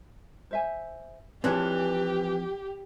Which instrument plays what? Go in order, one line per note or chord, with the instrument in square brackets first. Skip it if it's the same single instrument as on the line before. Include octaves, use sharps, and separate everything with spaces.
[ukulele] C5 E5 G#5
[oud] E3 D4 [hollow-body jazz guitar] F3 C4 [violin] G4 [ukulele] G#4 C#5 A5